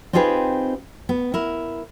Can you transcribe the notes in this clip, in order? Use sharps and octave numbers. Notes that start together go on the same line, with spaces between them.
C4 D#4 F4 G4 G#4 B4
B3
E4 A#4